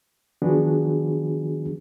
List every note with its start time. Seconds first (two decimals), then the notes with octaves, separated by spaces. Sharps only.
0.42 D#3 F3 B3 D4 F#4 G#4